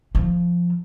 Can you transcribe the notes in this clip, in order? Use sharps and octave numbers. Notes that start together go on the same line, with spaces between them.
F3